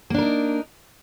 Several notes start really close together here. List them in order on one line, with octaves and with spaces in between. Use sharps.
A#3 D4 A#4 D#4